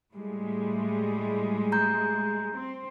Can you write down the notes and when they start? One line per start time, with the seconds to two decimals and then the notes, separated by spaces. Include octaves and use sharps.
0.13 A2 G3 G#3
1.72 A#5 G6
2.55 C4